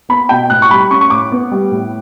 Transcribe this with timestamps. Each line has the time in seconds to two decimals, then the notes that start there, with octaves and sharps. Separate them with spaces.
0.09 B3 B5
0.29 B2 G5
0.50 A2 F#6
0.62 C#6
0.71 G3 B5
0.91 C#4 C#6
1.01 C#6
1.10 A2 D6
1.32 B3
1.52 G3
1.71 A2